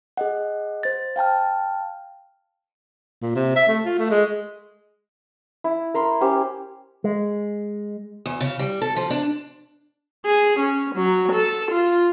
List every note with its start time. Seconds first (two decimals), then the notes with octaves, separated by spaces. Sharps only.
0.17 G#4 D#5 F#5
0.83 C5 A6
1.16 F5 G5 A5 F6
3.22 A#2
3.35 C3
3.56 E5
3.68 A3
3.85 F4
3.98 A3
4.11 G#3
5.64 E4
5.94 A#4 B5 C6
6.21 C#4 G4 C5
7.04 G#3
8.26 E2
8.40 C#3
8.59 G3
8.82 A4
8.96 F3
9.10 D4
10.26 G#4
10.59 C#4
10.96 F#3
11.32 A4
11.71 F4